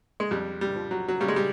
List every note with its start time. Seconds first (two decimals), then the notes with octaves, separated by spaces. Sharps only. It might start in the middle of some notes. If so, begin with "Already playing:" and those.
0.20 G#3
0.31 F2 G3
0.61 G3
0.76 F3
0.91 F#3
1.08 F#3
1.20 C#3 G3
1.28 G#3
1.36 G3